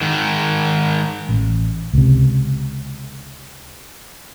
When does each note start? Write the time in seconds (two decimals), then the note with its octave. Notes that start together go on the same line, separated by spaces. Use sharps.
0.01 G#2 D#3
1.29 A1
1.93 C#2 C3